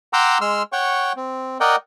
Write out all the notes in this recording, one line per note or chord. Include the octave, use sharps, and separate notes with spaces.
F#5 G5 A#5 C6 D6 E6
G#3 C6 E6 F6
C#5 F#5 G5 C#6
C4
A#4 D5 D#5 F#5 G5